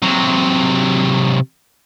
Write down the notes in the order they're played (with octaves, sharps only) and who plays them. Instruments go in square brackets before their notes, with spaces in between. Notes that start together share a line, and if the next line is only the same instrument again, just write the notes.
[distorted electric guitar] C3 F#3